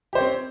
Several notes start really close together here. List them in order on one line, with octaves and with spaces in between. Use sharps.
G4 C5 C#5 C4